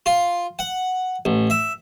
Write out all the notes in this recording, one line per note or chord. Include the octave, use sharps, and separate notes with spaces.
F4
F#5
A1
E5